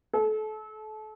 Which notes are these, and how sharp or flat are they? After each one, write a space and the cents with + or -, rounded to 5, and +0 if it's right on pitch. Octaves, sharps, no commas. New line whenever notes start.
A4 -30